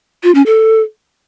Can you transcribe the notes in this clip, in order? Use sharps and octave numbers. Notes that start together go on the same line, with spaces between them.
F4
C#4
A4